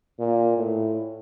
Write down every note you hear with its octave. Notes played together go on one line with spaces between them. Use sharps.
A#2
A2